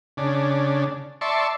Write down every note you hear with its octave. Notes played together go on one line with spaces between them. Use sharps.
C#3 D4
D5 E5 A5 C6 C#6